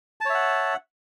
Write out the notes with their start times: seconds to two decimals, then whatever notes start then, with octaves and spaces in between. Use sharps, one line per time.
0.21 A5
0.25 C#5
0.30 E5
0.34 F#5